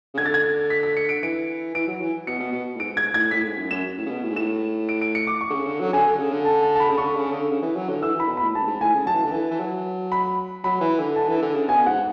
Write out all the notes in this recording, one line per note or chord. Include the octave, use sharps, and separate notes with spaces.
C#3
D3 G#6
A6
G#6
B6
B6
C#7
D7
E3 D7
E3 D7
F#3
E3
B2 C#7
B2
B2
A2
G#2 D7
G#2 G#6
A2 G#6
A2 B6
G#2
F#2
F#2 E7
A2
C#3
B2
A2
G#2
A2 E7
D7
D7
C#7
D6
C#6
D3
C#3
D3
F#3
D3 G#5
D3
C#3
D3
A5
A5
A5
B5
C#3
D3 C#6
C#3
D3
C#3
E3
F#3
D3
E3 E6
E3 B5
B2
A2 B5
G#2 A5
F#2
G#2
A2 G#5
C#3
F#3 A5
E3
D3
E3
E3
F#3
B5
F#3 B5
E3
D3
A5
E3
D3
C#3
B2 G#5
G#2 F#5